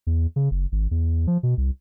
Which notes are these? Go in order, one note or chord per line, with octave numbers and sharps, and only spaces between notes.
E2
C#3
F#1
G#1
E2
F3
B2
C2